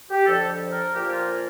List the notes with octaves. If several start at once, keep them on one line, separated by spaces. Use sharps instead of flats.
G4
F2 D3 F3 A4
A#4
A#2 F3 A#3 G4
F4